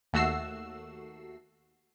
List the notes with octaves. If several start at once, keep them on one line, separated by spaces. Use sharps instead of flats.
D#2 A3 F#4 E6 C7